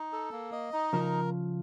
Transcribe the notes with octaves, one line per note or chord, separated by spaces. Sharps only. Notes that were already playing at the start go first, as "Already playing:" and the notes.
Already playing: D#4
A4
A#3
D#5
D#4
C#3 F3 A#4